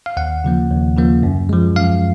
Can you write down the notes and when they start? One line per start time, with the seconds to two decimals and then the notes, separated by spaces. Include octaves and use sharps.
0.06 F5
0.17 D#2 F#5
0.44 C#3 F3 A#3
0.70 D#2
0.97 C#3 F3 A#3
1.23 F#2
1.49 F3 G#3
1.76 F#2 F5